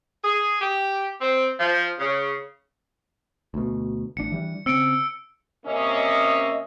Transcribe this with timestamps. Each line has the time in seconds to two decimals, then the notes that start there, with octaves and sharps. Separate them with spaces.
0.23 G#4
0.61 G4
1.21 C4
1.60 F3
1.99 C#3
3.54 D2 B2
4.17 A1 D4 C#7
4.32 E3 G3 D4
4.66 C#3 C4 E6 C#7 D7
5.66 C3 A#3 C#4 D#5 E5